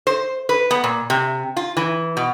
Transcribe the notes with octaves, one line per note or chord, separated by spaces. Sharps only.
C5
B4
B3
A#2
C3
F4
E3
B2